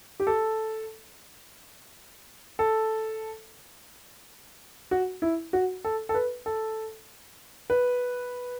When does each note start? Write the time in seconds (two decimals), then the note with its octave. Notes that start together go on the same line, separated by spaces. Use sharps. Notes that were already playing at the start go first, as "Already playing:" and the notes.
0.20 G4
0.27 A4
2.59 A4
4.91 F#4
5.22 E4
5.53 F#4
5.85 A4
6.09 A4
6.14 B4
6.46 A4
7.70 B4